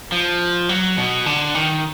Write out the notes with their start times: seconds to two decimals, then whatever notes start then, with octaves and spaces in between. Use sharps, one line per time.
0.12 F3
0.69 F#3
0.97 B2
1.26 D3
1.55 D#3